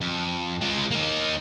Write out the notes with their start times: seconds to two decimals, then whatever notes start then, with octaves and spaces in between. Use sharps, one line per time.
0.01 F2
0.61 G#3 F4
0.91 A#3 D#4